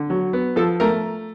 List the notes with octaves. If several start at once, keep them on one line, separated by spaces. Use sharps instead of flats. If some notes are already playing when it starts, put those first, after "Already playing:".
Already playing: D3
F#3
B3
F3 A4
A3 A#4